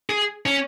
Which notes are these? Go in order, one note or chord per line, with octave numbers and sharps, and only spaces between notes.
G#4
C#4